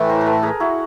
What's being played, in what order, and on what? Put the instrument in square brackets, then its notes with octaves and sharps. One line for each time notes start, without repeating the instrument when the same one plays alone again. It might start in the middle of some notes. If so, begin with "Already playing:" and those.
Already playing: [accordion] A2 E3 A3
[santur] A#4 C5
A#4
A4 B4
G#4 A#4
E4 F#4